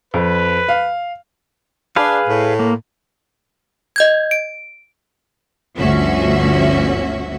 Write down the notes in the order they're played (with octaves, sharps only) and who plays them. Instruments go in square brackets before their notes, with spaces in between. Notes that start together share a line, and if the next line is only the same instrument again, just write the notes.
[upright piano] F2 [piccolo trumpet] B4
[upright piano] F5
[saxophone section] D4 [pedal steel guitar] G#4 B4 F5
[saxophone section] A2
[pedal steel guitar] A#3
[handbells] D#5 G6 G#6
D7
[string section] G1 D2 F3 C#4 F#4 E5